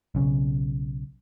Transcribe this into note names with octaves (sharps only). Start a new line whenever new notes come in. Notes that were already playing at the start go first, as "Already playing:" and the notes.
B1 C#3